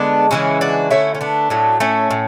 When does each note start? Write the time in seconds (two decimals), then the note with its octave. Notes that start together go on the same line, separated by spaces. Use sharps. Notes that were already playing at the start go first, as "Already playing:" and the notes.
Already playing: D3 G#3 B3 D4
0.31 C#3 E3 G#3 C#4 E4
0.61 D4 F#4
0.91 D3 A3 C#4 E4
1.15 C#4
1.21 B3 D4
1.50 A2 F#3 A3
1.80 A3 C#4
2.11 A2